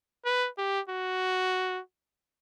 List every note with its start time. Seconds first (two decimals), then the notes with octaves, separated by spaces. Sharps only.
0.25 B4
0.58 G4
0.90 F#4